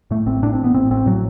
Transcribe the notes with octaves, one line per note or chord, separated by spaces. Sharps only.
A2 A3
A1 C4
A2 D4
C4
A1
B3
A2 C4
A1 C4
A2 F#3